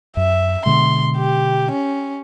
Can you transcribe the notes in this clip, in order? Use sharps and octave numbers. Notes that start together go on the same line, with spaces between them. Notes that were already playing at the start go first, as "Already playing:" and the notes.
F#2 E5
B2 D3 G#3 C6
G4
C#4